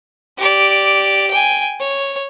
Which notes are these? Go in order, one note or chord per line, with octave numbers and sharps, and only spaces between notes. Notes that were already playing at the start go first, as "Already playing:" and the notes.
G4 D5
G5 G#5
C#5